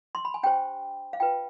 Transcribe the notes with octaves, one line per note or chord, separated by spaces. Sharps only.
C6
B5
G#5
D4 G4 C5 G5
F5
F4 B4 G5